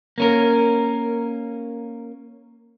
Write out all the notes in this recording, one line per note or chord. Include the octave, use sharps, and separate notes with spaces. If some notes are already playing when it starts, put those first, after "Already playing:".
A#3 C#4 A#4